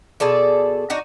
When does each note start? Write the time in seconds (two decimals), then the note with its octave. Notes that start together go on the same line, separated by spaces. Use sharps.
0.20 B2 G#4 A4 D5
0.90 D4 D#4 F#4